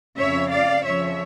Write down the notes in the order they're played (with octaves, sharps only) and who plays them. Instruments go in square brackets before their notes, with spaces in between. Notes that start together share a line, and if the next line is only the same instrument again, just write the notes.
[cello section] F2 C#3 F3 C#5 E5
D5 F5
F2 C#3 F3 C#5 E5